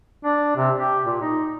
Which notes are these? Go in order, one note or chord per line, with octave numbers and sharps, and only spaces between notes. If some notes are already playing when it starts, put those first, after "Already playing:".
D4
C3
G4
A#2
D#4